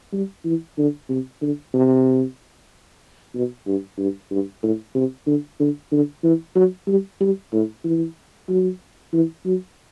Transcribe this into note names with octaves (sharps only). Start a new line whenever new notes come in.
G3
E3
D3
C3
D3
C3
B2
G2
G2
G2
A2
C3
D3
D3
D3
E3
F#3
G3
G3
A2
E3
F#3
E3
F#3